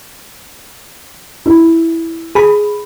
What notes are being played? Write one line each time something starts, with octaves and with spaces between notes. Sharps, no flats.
E4
G#4 B5